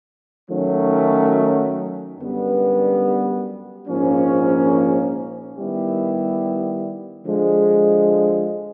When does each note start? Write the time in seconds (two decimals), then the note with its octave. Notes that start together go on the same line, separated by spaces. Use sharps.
0.49 D#3 F#3 A3 C#4
2.18 F#2 D3 G3 B3
3.87 A#1 G#2 F3 A#3 C#4
5.57 D#3 G3 B3 E4 G4
7.25 D3 F3 G#3